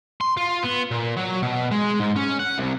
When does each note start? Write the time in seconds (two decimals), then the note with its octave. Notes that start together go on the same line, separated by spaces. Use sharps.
0.21 C6
0.37 F4
0.63 B3
0.91 A#2
1.17 F#3
1.42 B2
1.71 G#3
1.99 G#2
2.16 C#4
2.39 F#5
2.58 C2